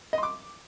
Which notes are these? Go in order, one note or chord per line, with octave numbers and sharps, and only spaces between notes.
D#5
C6
D6